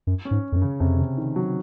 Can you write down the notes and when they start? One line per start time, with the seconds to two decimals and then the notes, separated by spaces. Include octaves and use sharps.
0.07 F#2
0.25 C#4
0.31 G#2
0.52 F2
0.56 F#2
0.62 C#3
0.80 F2 C3
0.99 C#3
1.17 D#3
1.36 F#3